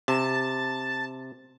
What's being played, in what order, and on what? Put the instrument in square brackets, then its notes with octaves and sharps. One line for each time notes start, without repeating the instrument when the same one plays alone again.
[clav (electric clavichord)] C3 [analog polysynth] A5